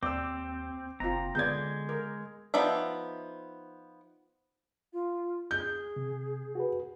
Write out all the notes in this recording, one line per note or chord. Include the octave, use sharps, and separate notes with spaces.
D#2 C4 D5 D6 E6
F#1 C4 F4 A#5
D3 G#3 B3 G#4 D5 G6 G#6
A#4
F3 B3 D#4 D5 E5
F4
G#4 G6
C3
F#4 G#4 B4